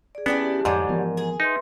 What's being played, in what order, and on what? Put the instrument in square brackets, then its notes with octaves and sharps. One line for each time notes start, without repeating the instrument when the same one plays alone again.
[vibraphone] G#4 D5
[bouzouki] E3 D4 G4 [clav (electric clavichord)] B3 [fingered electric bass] C#4
[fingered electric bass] F2 [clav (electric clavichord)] G#2 [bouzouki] D3 F#3 G3 [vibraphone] D6
[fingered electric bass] E3 F3 B3 [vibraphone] A#4
[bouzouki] G#4
[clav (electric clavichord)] D#4 [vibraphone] B4 E5 C6